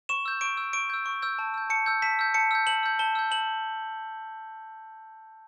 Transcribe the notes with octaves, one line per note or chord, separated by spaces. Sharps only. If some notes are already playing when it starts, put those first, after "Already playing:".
C#6 E7
E6 G6
C#6 D7
E6 G6
C#6 D7
E6 G6
C#6
E6 G6
A5
E6 G6
A5 C#7
E6 G6
A5 B6
E6 G6
A5 C#7
E6 G6
A5 F#7
E6 G6
A5 G7
E6 G6
A5 F#7